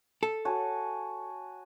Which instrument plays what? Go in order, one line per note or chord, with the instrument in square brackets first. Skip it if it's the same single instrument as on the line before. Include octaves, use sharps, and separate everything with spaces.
[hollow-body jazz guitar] A4
[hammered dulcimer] F#4 G#5 A5